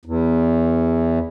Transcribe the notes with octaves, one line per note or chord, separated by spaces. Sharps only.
E2